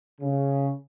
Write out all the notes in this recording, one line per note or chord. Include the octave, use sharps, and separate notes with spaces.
C#3